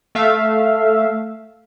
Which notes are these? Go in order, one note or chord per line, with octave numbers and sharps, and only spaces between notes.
A3 E5 F5